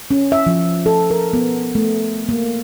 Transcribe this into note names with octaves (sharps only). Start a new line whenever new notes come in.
C#4
E5
F3
A4
A#4
B3
A3
A#3